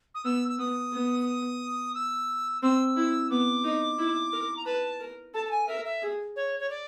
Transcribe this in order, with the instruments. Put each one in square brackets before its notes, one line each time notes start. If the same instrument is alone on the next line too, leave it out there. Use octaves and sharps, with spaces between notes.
[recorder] D#6
[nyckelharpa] B3 [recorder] E6
[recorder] E6
[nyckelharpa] B3 [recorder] D#6
[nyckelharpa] B3
[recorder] E6
[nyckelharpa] C4 [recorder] E6
[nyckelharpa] E4
[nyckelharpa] B3 [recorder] D6
[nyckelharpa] D#4
E4
A#4
[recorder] A#5
[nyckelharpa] B4 [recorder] A5
[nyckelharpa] A#4
[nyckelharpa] A4 [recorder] A5
[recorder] A5
G#5
[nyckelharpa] A#4 [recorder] E5
[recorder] E5
[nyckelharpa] G#4
[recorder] C#5
C#5
D5